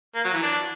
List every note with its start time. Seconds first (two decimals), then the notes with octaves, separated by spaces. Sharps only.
0.15 A#3
0.24 F#3
0.34 E3
0.43 D4